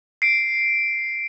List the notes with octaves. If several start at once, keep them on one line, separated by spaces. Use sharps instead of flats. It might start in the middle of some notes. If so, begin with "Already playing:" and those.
C7 D7